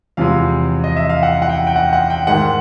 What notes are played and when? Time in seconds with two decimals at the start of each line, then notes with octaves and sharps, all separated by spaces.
0.17 E2 C3 F3 G#3 F5
0.84 D#5
0.96 E5
1.09 F5
1.23 F#5
1.42 F#5
1.49 G5
1.67 G5
1.76 F#5
1.93 F#5
2.10 G5
2.27 G#2 D#3 G#3 F#5